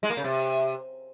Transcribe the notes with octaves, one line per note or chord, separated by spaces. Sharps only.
G#3
A#3
C#3
C3